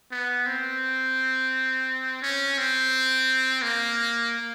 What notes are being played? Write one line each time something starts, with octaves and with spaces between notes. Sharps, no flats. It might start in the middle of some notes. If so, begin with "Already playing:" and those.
B3
C4
C#4
C4
A#3